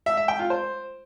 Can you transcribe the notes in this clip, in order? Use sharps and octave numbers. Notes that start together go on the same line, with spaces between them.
E5
E5
G5
F4
C5